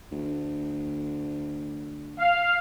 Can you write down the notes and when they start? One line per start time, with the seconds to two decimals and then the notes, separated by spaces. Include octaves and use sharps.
0.12 D2
2.16 F5